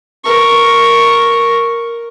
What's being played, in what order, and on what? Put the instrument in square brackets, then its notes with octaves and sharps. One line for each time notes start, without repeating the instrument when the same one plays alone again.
[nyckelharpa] A#4 C#6